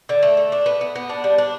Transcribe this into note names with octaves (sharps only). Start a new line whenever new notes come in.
D3
A3
A3
D4
B3
B3
B3
D4
G3
D4